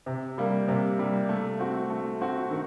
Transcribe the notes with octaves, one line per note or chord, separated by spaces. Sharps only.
C3
G3 A#3
C3
G3 A#3
A3
C4 F#4
A3
C4 F#4
D#3